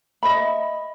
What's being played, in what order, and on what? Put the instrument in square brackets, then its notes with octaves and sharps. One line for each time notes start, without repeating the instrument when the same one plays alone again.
[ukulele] D#5 E5 B5